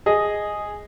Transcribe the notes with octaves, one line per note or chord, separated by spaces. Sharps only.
G#4 D#5